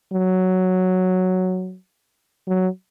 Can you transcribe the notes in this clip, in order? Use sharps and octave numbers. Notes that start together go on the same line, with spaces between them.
F#3
F#3